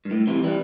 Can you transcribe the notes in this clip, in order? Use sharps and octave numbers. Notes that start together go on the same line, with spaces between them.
G2
A2
C3 E3
E3 G3